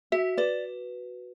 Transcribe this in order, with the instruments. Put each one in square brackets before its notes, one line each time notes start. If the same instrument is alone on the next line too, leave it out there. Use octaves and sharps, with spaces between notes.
[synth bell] F#4 [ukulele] E5
[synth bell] B4 [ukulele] D5